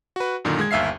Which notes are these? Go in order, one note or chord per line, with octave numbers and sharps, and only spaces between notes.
F#4 B4
F#2 A#2 D3 D#3
G#3 G#6
G1 D#2 E5 F5 C7